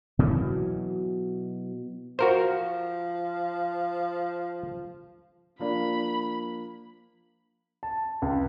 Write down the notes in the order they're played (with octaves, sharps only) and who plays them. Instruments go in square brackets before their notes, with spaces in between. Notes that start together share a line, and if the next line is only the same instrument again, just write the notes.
[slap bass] B2 E3 F#3
[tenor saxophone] F3 [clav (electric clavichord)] F#4 A#4 C5
[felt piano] F3 A#3 D4 [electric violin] B5
[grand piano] A5
C#2